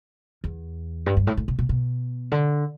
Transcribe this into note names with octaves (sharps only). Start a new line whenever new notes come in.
E2
G2
G2
A2
A2
B2
B2
B2
D3